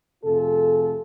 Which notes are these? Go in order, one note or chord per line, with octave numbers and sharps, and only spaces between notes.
F2 C3 A3 F4 G#4 A4